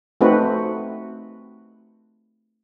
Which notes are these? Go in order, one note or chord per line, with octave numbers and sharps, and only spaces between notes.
A3 C4 D#4 F#4 B4